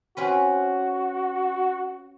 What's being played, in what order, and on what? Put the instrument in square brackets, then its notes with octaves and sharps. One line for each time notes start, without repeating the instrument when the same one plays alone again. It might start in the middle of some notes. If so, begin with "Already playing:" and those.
[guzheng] C4 C#4 B4 [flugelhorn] F#4